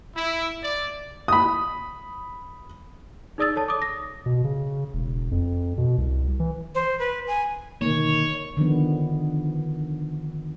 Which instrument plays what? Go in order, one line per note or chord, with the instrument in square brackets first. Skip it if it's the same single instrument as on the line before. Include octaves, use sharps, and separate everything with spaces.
[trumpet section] E4
D5
[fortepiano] B5 D#6
[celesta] D#4 G#4 D5 D#6 E6 A6
A4 C#5 A5
D6 D#6
A#6
[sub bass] B2
C#3
E1
F2
B2
C2
E3
[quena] C5
B4
G#5
[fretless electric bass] B2 D3 A#3 [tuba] D#3 [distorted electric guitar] C#5
[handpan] D3 D#3 F3 B3